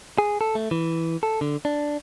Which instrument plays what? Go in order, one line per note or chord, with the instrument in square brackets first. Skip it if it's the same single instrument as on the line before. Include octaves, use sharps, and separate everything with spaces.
[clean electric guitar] G#4
A4
A3
E3
A4
D3
D4